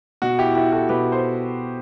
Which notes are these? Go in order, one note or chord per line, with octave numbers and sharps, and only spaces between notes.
B2 F#4
E4 G4
E4 G4
F#4 A4
B2 G4 B4
A4 C5